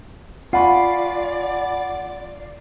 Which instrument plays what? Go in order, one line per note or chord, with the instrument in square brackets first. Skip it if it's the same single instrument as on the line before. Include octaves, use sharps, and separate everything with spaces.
[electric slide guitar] F4 [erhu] D5 [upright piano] F#5 [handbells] G#5 B5 C#6